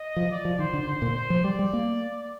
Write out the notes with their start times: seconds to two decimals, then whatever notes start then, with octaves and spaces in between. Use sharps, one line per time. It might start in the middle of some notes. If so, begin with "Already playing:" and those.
Already playing: D#5
0.16 F3
0.31 D5
0.45 F3
0.59 D#3 C5
0.74 D3
0.87 D3 C5
1.02 A#2
1.15 C5
1.30 F3
1.44 G3 D5
1.59 G3
1.73 A#3